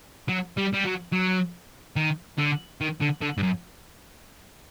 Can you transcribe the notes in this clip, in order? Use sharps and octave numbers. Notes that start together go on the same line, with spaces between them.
F#3
G3
G3
F#3
F#3
D#3
D3
D#3
D3
D3
G2
F#2